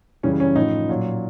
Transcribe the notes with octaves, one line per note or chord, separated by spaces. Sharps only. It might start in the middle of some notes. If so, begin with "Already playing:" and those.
F#2 C#3 E3 G3 C#4
C#4
A2 F3 D#4
A#2 F#3